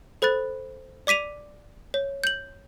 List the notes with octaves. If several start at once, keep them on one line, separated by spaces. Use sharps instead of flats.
A4 C5 B5 F#6 A6
D5 D6 B6 D#7 F7
C#5
G6 F#7